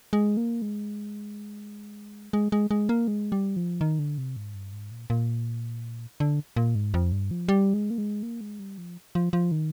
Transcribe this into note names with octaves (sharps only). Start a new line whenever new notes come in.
G#3
A#3
G#3
G#3
G#3
G#3
A#3
G#3
G3
F3
D#3
D3
C3
G#2
G2
G#2
A#2
A#2
D3
A#2
G#2
F2
G2
F3
G3
G#3
A#3
G#3
A#3
G#3
G3
F3
F3
F3
D#3